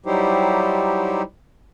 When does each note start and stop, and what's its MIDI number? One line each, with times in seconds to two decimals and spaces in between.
0.06 1.22 54
0.06 1.22 55
0.06 1.22 63
0.06 1.22 64
0.06 1.22 67
0.06 1.22 72